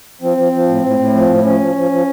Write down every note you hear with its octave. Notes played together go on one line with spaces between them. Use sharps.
F3 C4
F3
F3
A2
A2
A2
F3
A2
F3 C#4
F3
F3
F3